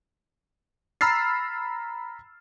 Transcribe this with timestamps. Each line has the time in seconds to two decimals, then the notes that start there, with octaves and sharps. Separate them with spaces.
1.01 A#5 B5 E6 F6 A6 C7